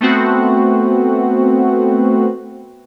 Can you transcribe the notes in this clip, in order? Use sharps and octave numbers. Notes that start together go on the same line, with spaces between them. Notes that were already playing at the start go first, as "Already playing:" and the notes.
A3 B3 C4 F#4